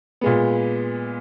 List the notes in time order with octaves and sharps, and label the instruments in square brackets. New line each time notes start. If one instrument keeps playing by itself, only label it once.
[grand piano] A#2 G#3 B3